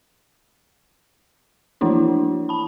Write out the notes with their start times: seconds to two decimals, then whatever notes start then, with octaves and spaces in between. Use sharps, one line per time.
1.81 E3 F3 A#3 D4 E4 F#4
2.49 A5 B5